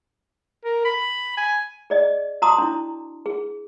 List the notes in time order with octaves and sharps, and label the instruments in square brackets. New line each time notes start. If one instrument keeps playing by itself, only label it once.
[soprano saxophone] A#4
B5
G#5
[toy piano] G#4 D5 D#5
F#4 A5 A#5 C6 D6 D#6
D4 E4
G#4